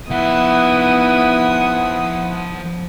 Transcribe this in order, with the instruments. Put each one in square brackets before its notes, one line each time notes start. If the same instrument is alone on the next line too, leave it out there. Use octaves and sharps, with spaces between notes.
[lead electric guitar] F3 E5 [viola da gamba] B3 [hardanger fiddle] E4 D#6 [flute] F#5